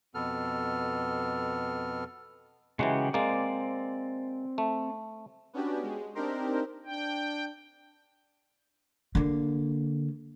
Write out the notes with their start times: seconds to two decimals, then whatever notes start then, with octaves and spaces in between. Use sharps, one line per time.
0.15 F2 B2 B3 A4 F6
2.79 C#3 E3 F#3 G#3 F#4 G4
3.14 G#3 A#3 C4 D5 D6
4.58 A3
5.53 B3 C#4 D4 F#4 G4
5.83 G#3
6.15 C4 D4 D#4 G4 A#4 C5
6.86 D4 G5
9.15 D3 A#3